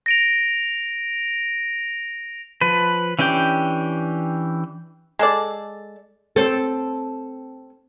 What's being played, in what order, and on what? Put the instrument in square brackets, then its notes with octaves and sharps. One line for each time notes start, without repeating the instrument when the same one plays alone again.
[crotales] A#6 D7 F7
[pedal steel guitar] F3 B4
E3 C#4 D4 G4 G5
[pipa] G#3 A4 D5
[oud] C4 A4